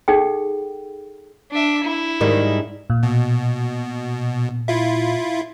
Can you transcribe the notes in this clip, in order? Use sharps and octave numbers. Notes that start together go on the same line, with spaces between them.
D#4 G#4 A4 F#5 G5
D4 E5
E4
G#2 D#3 G3
A#2
B2
E4 F4